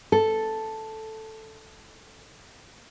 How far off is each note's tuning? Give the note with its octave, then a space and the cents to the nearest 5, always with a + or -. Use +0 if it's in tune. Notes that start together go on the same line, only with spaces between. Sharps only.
A4 +0